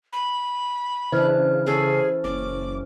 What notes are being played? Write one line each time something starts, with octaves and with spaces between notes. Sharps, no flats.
B5
C#3 E3 D4 C5 F6
C#4 E4 G#4 A4
F#1 C#4 D6